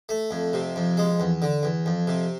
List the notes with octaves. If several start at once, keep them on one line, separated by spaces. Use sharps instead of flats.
A3
F2
C3
F2
G#3
E2
D3
E2
F2
C3